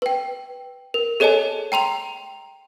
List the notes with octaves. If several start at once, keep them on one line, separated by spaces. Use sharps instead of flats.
B4 G5
A#4
G#4 A4 C#5 D#5 G#5 A5
G5 A#5 C6 F7